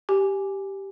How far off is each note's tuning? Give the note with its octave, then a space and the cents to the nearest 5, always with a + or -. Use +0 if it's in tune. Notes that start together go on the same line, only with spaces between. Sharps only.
G4 -5 G#5 +0